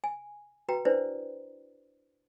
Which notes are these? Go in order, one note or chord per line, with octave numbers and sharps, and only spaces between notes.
G#5
F#4 B4 G5 A#5
D4 E4 B4 C5 D5